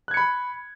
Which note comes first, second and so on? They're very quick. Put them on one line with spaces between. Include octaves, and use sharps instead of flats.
F#6 G#6 C#7 B5